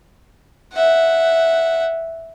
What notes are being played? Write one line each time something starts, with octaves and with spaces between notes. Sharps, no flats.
E5 F#5